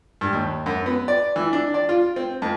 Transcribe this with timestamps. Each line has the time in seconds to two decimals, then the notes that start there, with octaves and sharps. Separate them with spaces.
0.21 G2
0.33 D#2
0.66 F#2
0.86 B3
1.08 D5
1.36 E3
1.53 D4
1.74 D5
1.89 F4
2.16 C4
2.42 F2